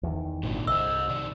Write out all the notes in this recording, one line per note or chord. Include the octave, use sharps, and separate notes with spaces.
E2 D#3
G#1 A#2 D3 D#3
C2 C5 D#5 E6
C3 D#3 D5